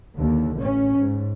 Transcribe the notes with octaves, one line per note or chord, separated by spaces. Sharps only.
D#2 D3
A1 C#4
G#2